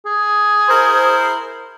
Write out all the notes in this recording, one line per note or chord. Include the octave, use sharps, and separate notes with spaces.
G#4
E4 A#4 C5